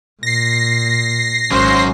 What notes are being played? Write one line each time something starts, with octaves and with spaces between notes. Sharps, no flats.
A#2 A#6 C7
G#1 F#2 C#4 C5